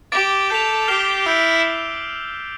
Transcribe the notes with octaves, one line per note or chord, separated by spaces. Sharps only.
G4 D6 A6 D7
A4 G6 B6 F7
G4 F6 C7 E7 G7
E4 E6 G6 D7